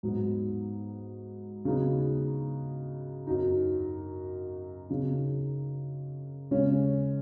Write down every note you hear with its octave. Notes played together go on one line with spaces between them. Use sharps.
G#2 F#3 B3 D#4
C#3 F#3 B3 D#4
F#2 F#3 D#4
C#3 F#3 D#4
C#3 G#3 C#4